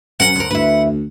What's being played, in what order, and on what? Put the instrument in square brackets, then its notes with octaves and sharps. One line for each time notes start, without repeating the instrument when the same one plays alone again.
[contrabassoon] F#2 [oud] C#4 A#4 [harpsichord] F#5
[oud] D2 A#4
[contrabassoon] D2 [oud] E4 B4